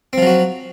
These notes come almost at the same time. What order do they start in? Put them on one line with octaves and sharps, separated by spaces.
C4 F3 F#3 F#4